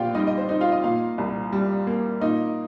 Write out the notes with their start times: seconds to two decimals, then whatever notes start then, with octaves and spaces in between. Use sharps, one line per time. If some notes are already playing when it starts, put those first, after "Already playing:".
Already playing: A#1 A#2 F4 G4 F5 G5
0.15 G3 D#4 D#5
0.27 D#5
0.38 C5
0.49 D#4
0.61 F4 F5
0.72 D#5
0.84 A#2 F4 F5
1.18 C2
1.52 G3
1.87 A#3
2.21 A#2 D#4 D#5